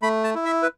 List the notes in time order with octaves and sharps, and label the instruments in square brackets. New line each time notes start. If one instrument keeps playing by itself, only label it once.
[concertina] A3 B5
A5
E4
E5
B4